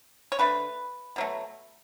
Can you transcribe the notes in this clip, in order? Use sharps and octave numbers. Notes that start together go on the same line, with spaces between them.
C#5
D3 A3 B4
B2 F#3 A3